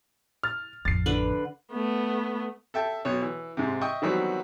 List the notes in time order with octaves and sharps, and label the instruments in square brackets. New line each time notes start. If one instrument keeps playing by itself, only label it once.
[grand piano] F6 A6
[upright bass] A1 F2 [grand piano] A6 C7
[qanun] D3 B4
[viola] A3 B3
[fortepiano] A4 E5 G5 A5
B1 B2 C#5
E3
G#2 C3
D#5 E5 G5 C#6 D#6
D#3 E3 F#3 G3 B3 C4